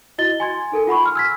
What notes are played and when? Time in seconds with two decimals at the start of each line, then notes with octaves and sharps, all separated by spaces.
0.18 E4 F#4 D#5 A6 G7
0.40 G#5 C6 G#6
0.72 D#4 A4 A#4 G#5
0.87 F4 F#5 B5 C#6
1.03 G#5 C6 F6
1.15 E6 G#6 B6